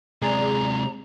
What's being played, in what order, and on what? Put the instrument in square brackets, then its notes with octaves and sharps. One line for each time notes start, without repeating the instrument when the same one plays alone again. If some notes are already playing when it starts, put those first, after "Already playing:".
[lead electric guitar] C3 G#3 [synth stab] G#4 D5 [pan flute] A#5